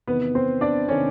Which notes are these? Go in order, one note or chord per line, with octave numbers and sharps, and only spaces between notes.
E2 C3 D#3 B3 B4
C4 C5
D4 D5
C3 D#3 C#4 C#5